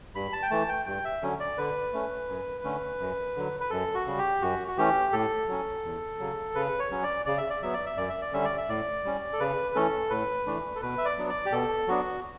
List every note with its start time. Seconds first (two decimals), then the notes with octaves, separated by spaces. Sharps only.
0.15 G2 B5
0.33 A5
0.43 G5
0.51 E3 A3 A5
0.69 G5
0.86 G2 G5
1.05 E5
1.22 D3 F#3 C#4
1.40 D5
1.58 D3 B4
1.93 A3 C#4
2.28 F#2
2.64 D3 A3 C#4
3.00 F#2
3.36 D3 F#3
3.60 B4
3.70 F#2 A4
3.95 F#4
4.07 C#3 G3
4.18 G4
4.42 F#2 F#4
4.68 F#4
4.78 E3 A3 C#4 G4
5.13 A2 A4
5.48 F#3 C#4
5.85 E2
6.19 C#3 F#3
6.55 C#3 B4
6.79 C#5
6.91 F#3 C#4
7.03 D5
7.26 C#3 D5
7.38 E5
7.50 D5
7.62 F#3 B3 E5
7.73 D5
7.86 E5
7.97 F#2 D5
8.09 E5
8.22 D5
8.33 D3 G3 C#4 E5
8.45 D5
8.58 E5
8.69 A2 D5
9.05 G3 C#4
9.33 A4
9.40 C#3 B4
9.75 E3 A3 C#4 A4
10.10 A2 B4
10.47 E3 A3 D4
10.76 A4
10.82 B2 B4
10.98 E5
11.05 D5
11.18 F#3 B3 D4
11.29 D5
11.46 G4
11.52 B2 A4
11.88 F#3 B3 D4 F#4